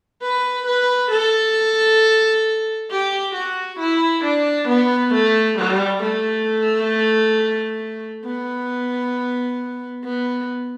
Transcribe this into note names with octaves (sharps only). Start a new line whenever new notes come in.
B4
B4
A4
G4
F#4
E4
D4
B3
A3
G3
A3
B3
B3